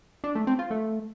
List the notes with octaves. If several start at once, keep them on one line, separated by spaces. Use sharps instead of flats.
D4
A3
C4
F4
A3